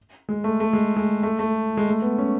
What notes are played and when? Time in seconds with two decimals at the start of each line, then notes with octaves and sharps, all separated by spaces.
0.29 G#3
0.44 A3
0.60 A3
0.73 G#3
0.96 G#3
1.23 A3
1.39 A3
1.77 G#3
1.90 A3
2.02 B3
2.18 C#4